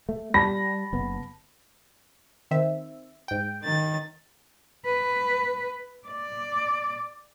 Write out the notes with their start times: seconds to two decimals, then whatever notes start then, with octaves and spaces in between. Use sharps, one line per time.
0.09 A3
0.34 G3 A5 B5 A#6
0.93 F#1 B3
2.51 D#3 C4 E5
3.28 G#2 G5
3.63 D#3 A6
4.86 B4
6.08 D5